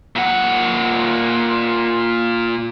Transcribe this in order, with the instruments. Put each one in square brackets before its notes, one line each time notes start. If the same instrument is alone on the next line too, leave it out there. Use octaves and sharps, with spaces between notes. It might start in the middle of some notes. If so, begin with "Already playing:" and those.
[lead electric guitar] A#2 F#5